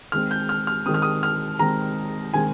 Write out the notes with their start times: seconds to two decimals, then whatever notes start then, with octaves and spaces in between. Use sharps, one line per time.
0.12 D#3 G#3 C4 F6
0.31 G6
0.49 F6
0.67 F6
0.86 D#3 G#3 C4 D#6
0.94 F6
1.02 D#6
1.23 F6
1.59 D#3 G#3 C4 A#5
2.34 D#3 G#3 C4 G#5